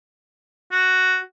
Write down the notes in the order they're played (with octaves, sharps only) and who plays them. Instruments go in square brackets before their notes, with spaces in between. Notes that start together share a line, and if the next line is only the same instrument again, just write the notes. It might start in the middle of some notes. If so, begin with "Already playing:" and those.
[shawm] F#4